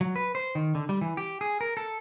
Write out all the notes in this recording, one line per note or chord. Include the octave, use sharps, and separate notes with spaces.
F#3
B4
C5
D#3
D3
G3
E3
G4
G#4
A#4
A4